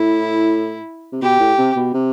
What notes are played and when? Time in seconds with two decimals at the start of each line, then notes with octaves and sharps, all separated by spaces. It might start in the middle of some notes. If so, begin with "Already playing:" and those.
Already playing: A2 E4
1.12 C3
1.22 B2 G4
1.40 A2
1.58 C3
1.76 B2
1.94 C3